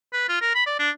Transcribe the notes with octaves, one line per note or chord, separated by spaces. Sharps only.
B4
F4
A#4
B5
D5
D4